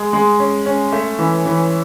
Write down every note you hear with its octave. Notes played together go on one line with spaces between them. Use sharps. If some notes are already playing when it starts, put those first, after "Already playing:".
Already playing: G#3
G#3
C#4
C#4
A3
E3
E3